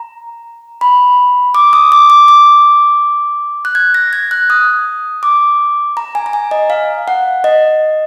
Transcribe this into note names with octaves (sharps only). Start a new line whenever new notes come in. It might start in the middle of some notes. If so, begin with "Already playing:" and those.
Already playing: A#5
B5
D6
D#6
D6
D6
D6
F#6
G#6
A#6
G#6
F#6
D#6
D6
A#5
G#5
A#5
G#5
D#5
F5
F#5
D#5